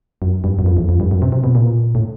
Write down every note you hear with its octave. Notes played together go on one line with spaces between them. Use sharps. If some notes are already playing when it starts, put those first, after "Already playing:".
F#2
G2
F#2
F2
E2
F2
G2
F#2
C3
C3
B2
A#2
A2